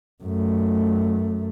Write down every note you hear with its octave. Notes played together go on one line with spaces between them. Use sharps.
F#2 A3